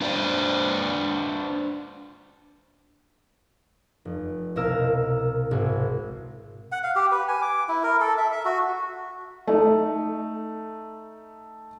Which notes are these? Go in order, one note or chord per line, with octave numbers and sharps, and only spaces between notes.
D4 B4 C5 D5
F1
C2 B2 A#4 F5 E6
G#1 G#3 G#5
F#5
F5
G4
B4
G#5
D6
E4
A#4
A4
E5
E5
F#4
A3 D#4